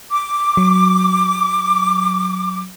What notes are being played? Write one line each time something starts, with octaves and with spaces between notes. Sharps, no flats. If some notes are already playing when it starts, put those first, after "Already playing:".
D6
F#3